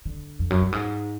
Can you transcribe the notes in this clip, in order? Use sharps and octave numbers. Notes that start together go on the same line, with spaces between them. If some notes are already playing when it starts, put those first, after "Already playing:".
D3
F2
F#2
G2
G#2